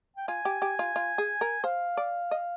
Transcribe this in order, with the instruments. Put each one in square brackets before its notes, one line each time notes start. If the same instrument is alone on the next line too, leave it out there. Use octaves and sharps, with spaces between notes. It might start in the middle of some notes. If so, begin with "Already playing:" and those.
[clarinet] G5
[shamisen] F4 [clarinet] G#5
[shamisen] G4
G4
F4
F4
G#4
A#4
[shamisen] C5 [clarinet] F5
[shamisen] D5
D#5